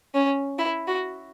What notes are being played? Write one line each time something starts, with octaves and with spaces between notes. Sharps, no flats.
C#4
E4
F#4